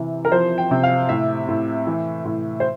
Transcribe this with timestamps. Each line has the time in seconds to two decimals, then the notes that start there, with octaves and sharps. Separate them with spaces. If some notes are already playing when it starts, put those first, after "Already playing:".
Already playing: C3 E3
0.25 A#4
0.32 F3 C5
0.58 G5
0.71 C3
0.83 F5
1.09 A2 E5
1.48 A2
1.87 E3
2.25 A2
2.60 C5